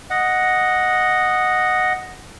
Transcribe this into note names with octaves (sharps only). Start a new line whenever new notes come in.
D#5 F#5